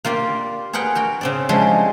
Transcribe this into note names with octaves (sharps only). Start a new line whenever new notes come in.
A#3 F4 G4 D5
G#4 A#4 B4 F#5 G5
F#4 A#4 G5
C#3 C4 D5
F3 G3 G#3 E4 F#4 G#4